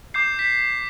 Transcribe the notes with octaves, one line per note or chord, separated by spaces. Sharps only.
D6 G6 C7
B6